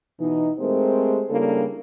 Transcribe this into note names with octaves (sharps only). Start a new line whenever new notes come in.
B2 E3 D#4
G#3 A3 C4 G4 A#4 C5
C#3 G3 A#3 D4 E4 A4